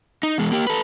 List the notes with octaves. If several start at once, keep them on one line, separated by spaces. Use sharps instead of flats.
D#4
E2 G#3
A#3 G4
A4 B4